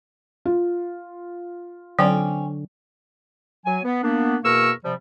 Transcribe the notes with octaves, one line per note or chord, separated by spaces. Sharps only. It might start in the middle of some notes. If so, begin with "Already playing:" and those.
F4
D3 F#3 C4 C#4 D5
F#3 G#5
B3
A#3 B3 D4
E2 B2 A#3 A#4 C#6 E6
C3 F3 G3